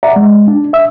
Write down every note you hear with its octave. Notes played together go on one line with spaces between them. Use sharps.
D5 E5 F#5 A#5
G#3
D4
E5 E6